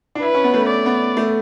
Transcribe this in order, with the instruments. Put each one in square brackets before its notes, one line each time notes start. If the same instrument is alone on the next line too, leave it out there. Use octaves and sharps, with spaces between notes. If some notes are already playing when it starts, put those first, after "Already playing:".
[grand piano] D4
[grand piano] E4 [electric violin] B4
[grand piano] C#4
B3
A3
[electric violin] D5
[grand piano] B3
A3